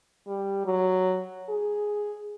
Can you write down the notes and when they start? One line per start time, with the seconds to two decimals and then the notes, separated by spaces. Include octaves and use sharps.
0.27 G3
0.65 F#3
1.49 G#4